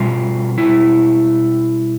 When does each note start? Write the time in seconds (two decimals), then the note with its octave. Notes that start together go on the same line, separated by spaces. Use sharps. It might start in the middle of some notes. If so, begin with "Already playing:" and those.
Already playing: B2 G3 F4
0.58 E4